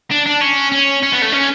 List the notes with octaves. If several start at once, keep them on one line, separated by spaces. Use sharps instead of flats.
D4
D4
C#4
C#4
C#4
B3
A3
C#4